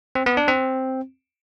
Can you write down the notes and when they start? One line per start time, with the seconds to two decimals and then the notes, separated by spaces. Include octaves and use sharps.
0.15 C4
0.26 B3
0.37 D4
0.48 C4